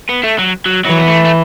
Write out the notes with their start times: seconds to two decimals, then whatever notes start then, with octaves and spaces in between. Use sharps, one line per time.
0.09 B3
0.24 A3
0.39 F#3
0.66 F#3
0.85 E3 F#3
0.98 B3
1.08 A3
1.25 A3